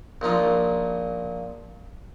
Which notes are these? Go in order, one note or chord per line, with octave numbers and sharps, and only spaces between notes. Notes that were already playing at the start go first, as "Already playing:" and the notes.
A#1 A#2 D#4 F4